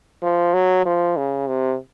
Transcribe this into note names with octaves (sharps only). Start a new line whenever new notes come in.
F3
F#3
F3
C#3
C3